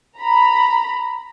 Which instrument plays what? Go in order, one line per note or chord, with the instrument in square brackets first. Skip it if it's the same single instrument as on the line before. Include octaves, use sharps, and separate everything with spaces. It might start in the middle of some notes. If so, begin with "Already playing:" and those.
[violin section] A#5 B5